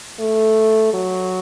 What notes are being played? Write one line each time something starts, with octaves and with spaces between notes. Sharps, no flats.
A3
F#3